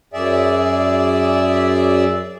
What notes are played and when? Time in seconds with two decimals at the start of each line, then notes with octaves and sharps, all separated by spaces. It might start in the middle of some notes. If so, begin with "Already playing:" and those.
0.13 F#2 G#4 D5 E5